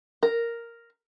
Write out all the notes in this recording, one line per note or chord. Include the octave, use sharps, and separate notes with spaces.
A#4